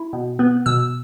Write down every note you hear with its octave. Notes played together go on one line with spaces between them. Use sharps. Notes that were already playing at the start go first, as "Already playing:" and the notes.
Already playing: E4
B2
B3
B2 E6